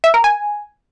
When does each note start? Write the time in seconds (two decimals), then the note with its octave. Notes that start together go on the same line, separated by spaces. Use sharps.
0.04 E5
0.14 A#4
0.24 G#5